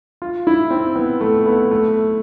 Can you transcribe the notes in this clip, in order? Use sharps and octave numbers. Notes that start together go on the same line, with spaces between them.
F4
E4
C4
B3
A3
B3
A3